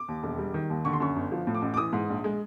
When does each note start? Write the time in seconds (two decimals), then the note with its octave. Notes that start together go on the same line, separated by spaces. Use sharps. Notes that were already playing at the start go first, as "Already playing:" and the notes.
Already playing: D6
0.08 D#2
0.23 E1
0.38 G3
0.54 D#3
0.70 D#2
0.85 D3 C#6
0.93 C6
1.00 F#2 C#6
1.16 G1
1.32 F3
1.47 A2
1.55 D6
1.62 A1
1.74 D6
1.77 E3 D#6
1.93 G#2
2.09 A#1
2.24 G#3